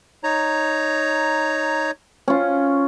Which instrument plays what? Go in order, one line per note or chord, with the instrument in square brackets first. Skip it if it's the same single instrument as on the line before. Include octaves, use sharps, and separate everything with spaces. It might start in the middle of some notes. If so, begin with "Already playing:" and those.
[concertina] D#4 C#5 A#5
[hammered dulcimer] C#4 F4